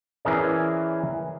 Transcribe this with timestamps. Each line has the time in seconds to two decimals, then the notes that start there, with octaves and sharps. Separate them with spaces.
0.25 E3 C#4 G#4 A#4 D5